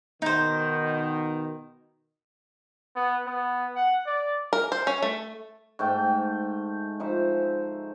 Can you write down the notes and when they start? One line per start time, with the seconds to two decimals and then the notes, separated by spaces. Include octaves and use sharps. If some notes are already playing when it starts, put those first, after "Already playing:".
0.22 B2 D#3 D#4 C5
2.96 B3
3.26 B3
3.76 F#5
4.06 D5
4.53 A#4
4.72 C5
4.87 C#4
5.03 A3
5.79 G#2 A3 G5 A5
7.00 F3 D#4 C5 E5